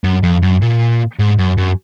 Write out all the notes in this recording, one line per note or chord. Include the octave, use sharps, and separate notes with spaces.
F#2
F2
F#2
A#2
G#2
F#2
F#2